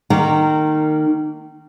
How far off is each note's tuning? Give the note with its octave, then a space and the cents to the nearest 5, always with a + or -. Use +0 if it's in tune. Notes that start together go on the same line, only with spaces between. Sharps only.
D#3 -15 A#3 -25